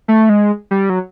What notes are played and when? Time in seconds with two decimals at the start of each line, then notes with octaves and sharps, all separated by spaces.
0.08 A3
0.29 G#3
0.71 G3
0.90 F#3